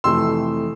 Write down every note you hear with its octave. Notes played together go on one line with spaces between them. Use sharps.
F2 C3 E3 A3 C6 E6